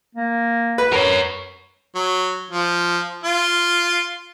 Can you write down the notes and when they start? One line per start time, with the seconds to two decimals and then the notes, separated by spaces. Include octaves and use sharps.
0.15 A#3
0.78 B4
0.93 A#4 C#5
1.95 F#3
2.51 F3
3.24 F4